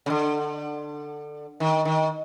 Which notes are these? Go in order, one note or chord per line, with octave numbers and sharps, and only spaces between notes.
C#3
D3
D#3
D#3